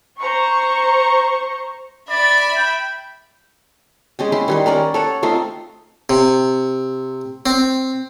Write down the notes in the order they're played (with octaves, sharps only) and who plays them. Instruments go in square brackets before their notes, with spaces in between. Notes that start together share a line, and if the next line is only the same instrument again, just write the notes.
[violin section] C5 A#5 C#6
[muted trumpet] D5 [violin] E5 B5
[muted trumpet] G5
[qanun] G#3 C#4 G5
C#4 E4 C6
D#3 G3 C6
C#4 A#4 D5 F#5
A4 C#5 F#5
A3 C4 D#4 F4
[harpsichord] C3
C4